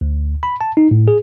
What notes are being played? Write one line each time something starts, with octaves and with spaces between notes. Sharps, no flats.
D2
B5
A5
D#4
A2
G#4